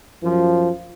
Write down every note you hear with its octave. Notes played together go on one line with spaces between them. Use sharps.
F#2 F3